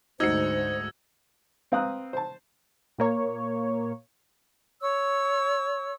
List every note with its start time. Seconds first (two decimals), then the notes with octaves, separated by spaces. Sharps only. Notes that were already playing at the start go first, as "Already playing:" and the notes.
0.20 D2 G#2 D#4 F#4 C5 E6 G#6 C#7
1.72 C4 B4 F5 A#5 D#6 F#6
2.13 C5 A5
2.98 A#2 A#3 C#5
4.82 C#5 C#6 E6